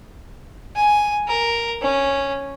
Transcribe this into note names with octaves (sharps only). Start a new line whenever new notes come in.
G#5
A#4
C#4